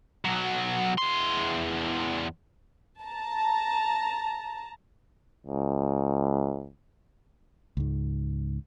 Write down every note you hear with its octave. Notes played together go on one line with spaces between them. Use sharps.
B1 F#3
E2 C6
A5 A#5
C#2
C#2 G#2